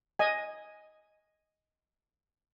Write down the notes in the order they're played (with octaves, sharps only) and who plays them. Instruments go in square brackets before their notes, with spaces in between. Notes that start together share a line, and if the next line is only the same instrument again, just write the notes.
[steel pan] D#5 G#5